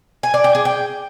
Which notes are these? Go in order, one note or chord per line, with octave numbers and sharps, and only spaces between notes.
G#5
D5
G5
G#4
G5